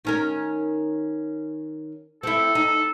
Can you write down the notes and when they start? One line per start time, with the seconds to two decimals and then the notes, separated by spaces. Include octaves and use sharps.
0.05 D#3 C#4 A#4
2.23 C4 E4 A4
2.55 D#4